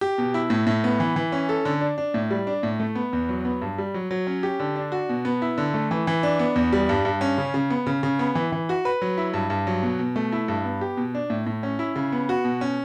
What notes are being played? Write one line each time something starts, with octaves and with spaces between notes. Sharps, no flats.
G4
B2
E4
A2
A2
B3
E3
E3
C#4
A4
D3
D4
D4
A2
G3
D4
A2
A3
B3
E2
F#3
B3
G2
G3
F#3
F#3
C#4
G4
D3
D4
F#4
B2
B3
E4
D3
A3
E3
E3
D4
B3
E2
G3
G2
G2
C#4
C#3
C#3
B3
C#3
C#3
B3
E3
E3
F#4
B4
F#3
E4
G2
G2
F#3
B2
B2
A3
E4
G2
B3
G4
B2
D4
A2
A2
C#4
E4
C#3
B3
F#4
B2
C#4